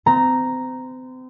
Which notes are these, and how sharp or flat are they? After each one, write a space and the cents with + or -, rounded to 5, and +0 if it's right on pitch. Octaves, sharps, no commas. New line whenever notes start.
C4 -35 A#5 +0